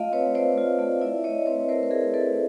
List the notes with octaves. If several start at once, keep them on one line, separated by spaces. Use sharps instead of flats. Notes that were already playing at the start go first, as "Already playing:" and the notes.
Already playing: A3 F4 D#5 F5
C4 B4 C#5
A3 C5 D5
F4
A3
E4 D5 E5
A3 C#5 D#5
C4 B4 C#5
A3 A#4 C5
B4
E4 G#4 A#4
A3 A4 B4